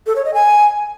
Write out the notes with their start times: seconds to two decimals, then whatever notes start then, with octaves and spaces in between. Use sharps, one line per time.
0.06 A4
0.16 C#5
0.25 D#5
0.34 G#5